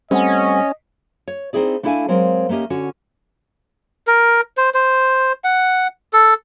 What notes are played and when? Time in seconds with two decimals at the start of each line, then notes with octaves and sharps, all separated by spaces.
0.11 G3 A3 C4 C#4 C5 D#5 F#5 G#5
1.28 C#5
1.53 C4 D#4 E4 G#4 D5
1.83 A3 D4 E4 A4 F5 G#5
2.08 F#3 G#3 C4 A#4 F5
2.49 A3 A#3 C#4 G4 D#5
2.70 D3 C#4 F#4
4.07 A#4
4.57 C5
4.74 C5
5.44 F#5
6.13 A4